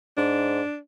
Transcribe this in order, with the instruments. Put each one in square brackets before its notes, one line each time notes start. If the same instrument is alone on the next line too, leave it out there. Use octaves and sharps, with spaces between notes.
[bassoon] G#2 [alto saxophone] D4